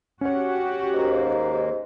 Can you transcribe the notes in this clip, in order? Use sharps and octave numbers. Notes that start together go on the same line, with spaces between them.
C#4 F#4 G4 C#5 F#5
D#2 G#2 A#3